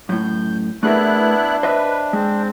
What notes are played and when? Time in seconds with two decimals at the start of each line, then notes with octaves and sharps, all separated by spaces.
0.09 F#2 A2 G6
0.83 A3 B3 D4 E4 G#4 A#4 F#6
1.63 B4 C5 D#5 E5
2.13 G#3 C4